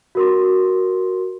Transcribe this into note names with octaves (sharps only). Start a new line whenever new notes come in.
F#4 A#4 C6